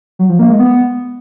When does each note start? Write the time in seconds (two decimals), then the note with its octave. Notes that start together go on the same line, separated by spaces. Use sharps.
0.19 F#3
0.29 F3
0.39 A#3
0.49 G#3
0.59 B3